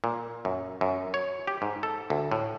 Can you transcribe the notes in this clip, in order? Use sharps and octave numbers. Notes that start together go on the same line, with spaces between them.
A#2
F#2
F#2
C#5
G4
G#2
A4
D2
A2